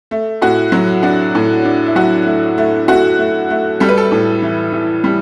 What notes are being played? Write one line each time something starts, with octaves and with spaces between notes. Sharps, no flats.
A3
A2 F#4
F#3
D4 F#4
A2
D4
E4
F#3 F#4
A3
A3
A3 F#4
A3
A3
G3 A4
B4
A4
A2
E3
E3
G3